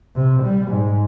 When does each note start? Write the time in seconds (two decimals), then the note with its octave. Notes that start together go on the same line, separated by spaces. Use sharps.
0.16 C3
0.43 G3
0.71 G#2